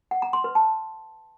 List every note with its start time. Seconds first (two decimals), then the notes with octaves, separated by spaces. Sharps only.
0.11 F#5
0.22 A#5
0.33 C6
0.44 B4
0.55 A5